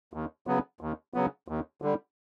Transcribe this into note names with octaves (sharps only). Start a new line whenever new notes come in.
D#2
C#3 F#3 B3
D#2
C#3 F#3 B3
D#2
D3 G3